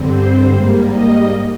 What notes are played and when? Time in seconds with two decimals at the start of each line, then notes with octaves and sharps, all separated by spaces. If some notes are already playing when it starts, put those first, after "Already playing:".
Already playing: G2 D3 G3 C4
0.12 C5
0.50 G#2 G3 A#3
0.90 D#5